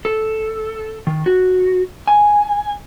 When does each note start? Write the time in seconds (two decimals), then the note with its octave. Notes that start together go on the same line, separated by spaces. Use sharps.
0.05 A4
1.07 D#3
1.26 F#4
2.08 G#5